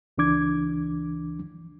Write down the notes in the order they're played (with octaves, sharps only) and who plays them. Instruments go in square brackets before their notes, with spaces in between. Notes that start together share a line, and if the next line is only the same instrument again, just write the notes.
[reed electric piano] C#2 E3 D4 D6 G#6